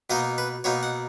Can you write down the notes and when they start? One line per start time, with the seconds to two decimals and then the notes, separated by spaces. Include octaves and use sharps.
0.10 B2 A#3 D#4 D#5
0.38 B4
0.64 B2 A#3 D#4 C#5
0.83 F#5